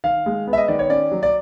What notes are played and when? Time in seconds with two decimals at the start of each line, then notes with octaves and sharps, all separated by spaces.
0.04 D#3 F5
0.26 G#3
0.47 B3
0.53 E5
0.58 D#5
0.68 D#3 D5
0.79 C#5
0.90 C#4 D5
1.11 F#3
1.23 D5